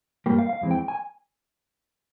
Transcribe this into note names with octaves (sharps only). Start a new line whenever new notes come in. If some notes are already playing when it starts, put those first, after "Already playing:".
G2 G3 A#3 G4
F5
F5
F2 E3 G#3 C4
G5
G#5